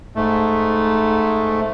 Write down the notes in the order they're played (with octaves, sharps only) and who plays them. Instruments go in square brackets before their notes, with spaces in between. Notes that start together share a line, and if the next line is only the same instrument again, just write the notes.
[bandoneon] G#2 A3